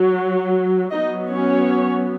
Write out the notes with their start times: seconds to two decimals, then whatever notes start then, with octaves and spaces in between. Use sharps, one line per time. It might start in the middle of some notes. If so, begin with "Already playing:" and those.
Already playing: F#3
0.91 F#3 B3 D#4 D#5
1.30 C#4 C#5